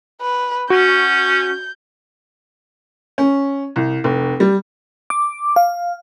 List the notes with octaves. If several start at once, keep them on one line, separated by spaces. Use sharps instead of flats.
B4
C#4 F#4 G6
C#4
C2
F1
G3
D6
F5